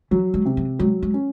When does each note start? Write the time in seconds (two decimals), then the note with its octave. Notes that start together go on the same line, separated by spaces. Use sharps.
0.11 E3 F#3
0.34 G#3
0.45 C3
0.57 F#3
0.79 F#3 G#3
1.03 G#3
1.14 C#4